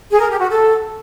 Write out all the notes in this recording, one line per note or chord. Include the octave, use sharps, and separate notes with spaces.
G#4
A#4
G4
F#4
A4